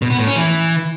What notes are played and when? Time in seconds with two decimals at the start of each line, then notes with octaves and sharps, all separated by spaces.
0.02 B2
0.10 B3
0.19 A2
0.27 C#4
0.36 E3